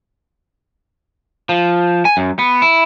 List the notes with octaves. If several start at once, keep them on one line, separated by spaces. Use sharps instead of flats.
F3
G#5
F#2
B3
E4